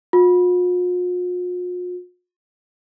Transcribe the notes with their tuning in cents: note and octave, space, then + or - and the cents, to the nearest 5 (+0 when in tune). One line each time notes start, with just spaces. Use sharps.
F4 +45